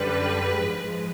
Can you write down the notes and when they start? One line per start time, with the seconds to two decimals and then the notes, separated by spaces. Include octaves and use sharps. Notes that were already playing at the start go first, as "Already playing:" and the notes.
Already playing: F#2 D3 G3 B4
0.54 G#2 F3 G#3